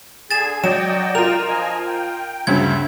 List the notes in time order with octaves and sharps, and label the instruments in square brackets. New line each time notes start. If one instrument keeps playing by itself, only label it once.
[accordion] D3 G#4 G#5 [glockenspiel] A6 E7
[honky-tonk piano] F#3 [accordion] D5 D#5 G5 [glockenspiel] E7
[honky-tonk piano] F4 A#4 [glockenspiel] F7
[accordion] F3 D#5 G#5
G5
[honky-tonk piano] D2 G2 C#3 [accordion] C4 E5 [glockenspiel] G#6